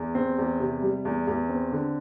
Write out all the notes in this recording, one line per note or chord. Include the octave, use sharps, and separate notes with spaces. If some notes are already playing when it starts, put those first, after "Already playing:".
Already playing: E2
C4
E2
C3
G3
E2
E2
C4
D3